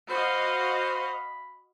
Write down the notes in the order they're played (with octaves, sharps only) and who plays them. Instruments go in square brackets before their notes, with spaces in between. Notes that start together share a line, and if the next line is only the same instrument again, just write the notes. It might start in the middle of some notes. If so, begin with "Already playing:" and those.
[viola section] F#4 D#5 F5 [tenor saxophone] C5 [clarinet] B5